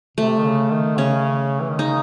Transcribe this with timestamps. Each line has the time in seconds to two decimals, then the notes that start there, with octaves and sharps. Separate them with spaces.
0.17 C3 A3
0.38 D#3
0.45 C#3
0.72 D#3
0.98 C#3 C#4
1.61 E3
1.70 D#3
1.79 C#3 D#4